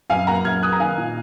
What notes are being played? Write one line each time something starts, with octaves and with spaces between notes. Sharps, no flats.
F#2 F5 G#5
A#3 F#5 A#5
F#2 F6 G#6
A#3 D#6 F#6
A#5
D#3 F5 G#5
A#2